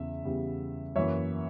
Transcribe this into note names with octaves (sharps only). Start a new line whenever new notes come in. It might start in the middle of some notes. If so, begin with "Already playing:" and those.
Already playing: E2 C#3 G3 B3 E5
E2 C#3 G3 B3
F#2 E3 A#3 C#5 E5